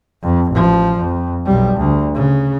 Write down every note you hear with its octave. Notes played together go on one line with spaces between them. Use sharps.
F2
A1 F3
F2
B1 G3
D2
C#3